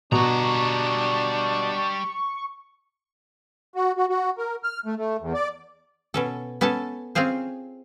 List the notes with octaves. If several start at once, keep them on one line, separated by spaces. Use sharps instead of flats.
B2 G3 D4 A#5 C#6
F#4
F#4
F#4
A#4
F6
A3
A3
E2
D5
B2 C#4 A4
B3 C#4 A4 G#5 A5
C4 C#4 F4 G#4 C5